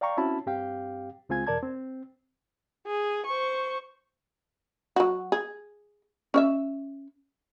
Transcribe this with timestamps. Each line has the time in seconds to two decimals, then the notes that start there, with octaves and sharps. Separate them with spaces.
0.01 D5 F5 G5 A#5 C#6
0.17 C4 C#4 E4 F#4 A5 B5
0.46 G2 C4 G4 F5 G5
1.29 C#2 G#3 C4 F4 G#5 G#6
1.47 E2 B2 A#4 D5 A5 G#6
1.63 C4
2.87 G#4
3.26 C5 C#6
4.96 F#3 F#4
5.32 G#4
6.34 C#4 D5 E5